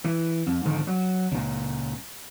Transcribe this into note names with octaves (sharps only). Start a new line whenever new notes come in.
E3
F2
G#2 D3 D#3 F3
F#3
C#2 A#2